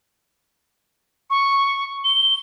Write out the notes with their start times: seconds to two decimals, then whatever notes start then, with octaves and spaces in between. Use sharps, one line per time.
1.30 C#6
2.05 G7